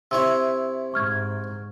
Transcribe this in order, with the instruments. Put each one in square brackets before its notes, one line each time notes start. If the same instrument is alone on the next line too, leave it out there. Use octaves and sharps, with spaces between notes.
[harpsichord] C3 E4 C#5 [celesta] E6
[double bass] G#2 [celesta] C#6 F6 G#6